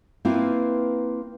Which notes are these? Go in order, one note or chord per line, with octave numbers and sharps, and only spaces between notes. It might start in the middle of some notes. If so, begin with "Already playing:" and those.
A#3 C4 E4 F4 B4